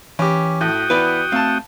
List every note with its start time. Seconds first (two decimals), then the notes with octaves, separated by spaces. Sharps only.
0.19 E3 C#4 G4
0.61 A2 F#4 G5 D#6
0.90 E3 B3 B4 D5
1.32 A3 C4 F5 A5